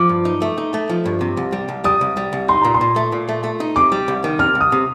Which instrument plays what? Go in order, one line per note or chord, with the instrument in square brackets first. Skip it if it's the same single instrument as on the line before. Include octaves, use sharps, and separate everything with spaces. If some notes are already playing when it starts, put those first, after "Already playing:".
Already playing: [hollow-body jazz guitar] F3 [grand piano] D6
[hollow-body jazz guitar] G2
D#4
A3
D#4
A3
F3
G2
C3
C2
G3
C2
[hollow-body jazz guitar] G3 [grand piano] D#6
[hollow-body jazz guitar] C2
G3
C2
[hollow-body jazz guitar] D#4 [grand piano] C6
[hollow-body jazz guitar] A#2 [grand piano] A#5
[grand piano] C6
[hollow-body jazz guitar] A#2
A3
A#2
A3
A3
D#4
[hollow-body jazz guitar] C3 [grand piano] D6
[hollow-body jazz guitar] G3
C2
D#3
[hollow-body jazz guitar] C3 [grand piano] F6
[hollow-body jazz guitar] C2
[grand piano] D#6
[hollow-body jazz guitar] C3